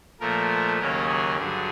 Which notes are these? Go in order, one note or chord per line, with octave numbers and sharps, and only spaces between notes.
A#2 F3 A3 A#4
D#2 C#3 F#3 A#3 C#4 A#4
G#4
G2 D3 F#3 G#4